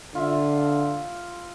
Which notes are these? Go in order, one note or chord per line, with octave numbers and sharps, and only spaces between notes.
D3 F4 E5